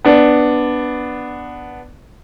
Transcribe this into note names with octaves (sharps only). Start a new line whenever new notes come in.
B3 D4